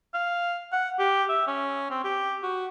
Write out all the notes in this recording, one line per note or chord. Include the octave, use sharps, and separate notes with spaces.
F5
F#5
G4
E5
C#4
C4
G4
F#4